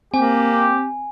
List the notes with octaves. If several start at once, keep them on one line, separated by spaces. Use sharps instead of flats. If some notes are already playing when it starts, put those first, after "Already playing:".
A#3 C4 G4 G#5